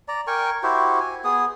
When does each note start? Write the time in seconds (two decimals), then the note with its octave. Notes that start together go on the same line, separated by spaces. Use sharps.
0.08 D5 A#5
0.27 A#4 G5 G#5 C#6
0.63 E4 F#4 G4 C5
1.00 G#5
1.24 B3 G#4 D#6